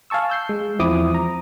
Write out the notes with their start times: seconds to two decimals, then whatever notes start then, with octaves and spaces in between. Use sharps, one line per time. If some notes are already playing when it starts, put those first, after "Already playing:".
0.10 F5 G#5 A5 C#6 E6
0.30 E6 G6 C7
0.49 G#3
0.79 E2 F3 C4 E4 D6 D#6
1.14 A#5